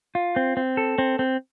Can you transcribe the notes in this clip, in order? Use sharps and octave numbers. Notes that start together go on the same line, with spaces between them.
F4
C4
C4
A4
C4
C4